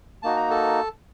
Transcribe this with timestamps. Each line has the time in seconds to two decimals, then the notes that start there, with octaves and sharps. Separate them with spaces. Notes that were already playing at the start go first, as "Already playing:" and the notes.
0.23 A#3 D#4 F#4 A5
0.36 A#5
0.50 A4 A5